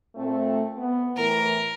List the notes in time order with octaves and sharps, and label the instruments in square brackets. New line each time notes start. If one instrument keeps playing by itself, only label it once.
[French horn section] A#2 A3 C4
B3
[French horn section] A2 E3 [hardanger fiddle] A#4